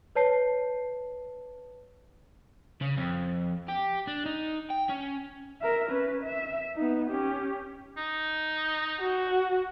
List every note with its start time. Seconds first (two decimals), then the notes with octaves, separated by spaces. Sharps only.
0.15 B4 C#5 A5 C7
2.81 C#3
2.97 F2
3.68 G4
4.07 D4
4.26 D#4
4.70 G5
4.89 C#4
5.61 A#4 E5
5.90 C#4 B4
6.23 E5
6.76 B3 D#4
7.10 C#4 G4
7.97 D#4
9.01 F#4